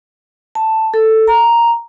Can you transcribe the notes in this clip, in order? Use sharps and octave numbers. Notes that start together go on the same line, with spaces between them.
A5
A4
A#5